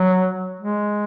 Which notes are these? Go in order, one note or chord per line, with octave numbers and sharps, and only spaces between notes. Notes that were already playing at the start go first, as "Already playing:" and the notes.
Already playing: F#3
G#3